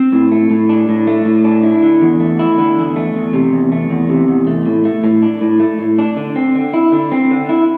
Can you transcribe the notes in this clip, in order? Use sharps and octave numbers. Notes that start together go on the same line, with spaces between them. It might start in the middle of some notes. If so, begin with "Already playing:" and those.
Already playing: C4
A2
A3
A2
D4
A2
A3
A2
D4
E4
D3
E2
A3
E4
D3
E2
A3
E2
C3
E2
A3
E2
C3
E2
A3
A2
A3
A2
D4
A2
A3
A2
D4
D3
C4
D3
E4
D3
C4
D3
E4